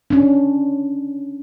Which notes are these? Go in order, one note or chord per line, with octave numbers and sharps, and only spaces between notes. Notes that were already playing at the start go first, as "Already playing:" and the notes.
C#4 D4